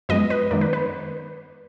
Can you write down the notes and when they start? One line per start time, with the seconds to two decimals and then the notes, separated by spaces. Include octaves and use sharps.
0.09 F#2 F3 G#3 B3 B4 D#5
0.30 B4
0.51 F#2 D#3 G#3 B3 A#4 D5
0.61 B4
0.73 B4